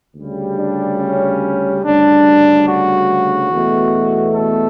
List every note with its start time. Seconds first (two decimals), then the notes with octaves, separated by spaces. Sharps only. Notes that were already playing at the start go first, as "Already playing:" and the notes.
0.15 D2 C#3 G3
0.59 D4
1.00 C#4
1.84 D2 C#3 G3 D4
2.68 F#4
3.51 E2 B2 A3
4.35 A4